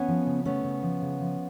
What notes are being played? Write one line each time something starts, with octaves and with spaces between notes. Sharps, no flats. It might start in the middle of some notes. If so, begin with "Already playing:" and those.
Already playing: B3 C#4
F3
C#3
A3 B3 C#4
C#3
F3
C#3
F3